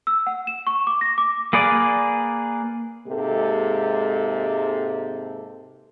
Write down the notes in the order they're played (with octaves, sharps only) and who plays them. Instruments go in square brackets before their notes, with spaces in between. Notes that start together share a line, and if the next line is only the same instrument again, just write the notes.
[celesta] E6
F#5
E7
C#6
D6
A#6
D6
[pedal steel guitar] A#3 G#4 B4 D5
[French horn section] G#2 C3 G#3 A#3 G4 A4